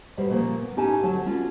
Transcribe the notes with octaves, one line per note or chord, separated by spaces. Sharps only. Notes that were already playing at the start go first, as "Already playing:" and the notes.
E2 B2 G3 C5
A#2 C#3 F3 A#3
B3
A2 C#4 D#4 G4 G#5 A5
D2 F#3 C#5 A5
B3 C#4 D4 F4 F#4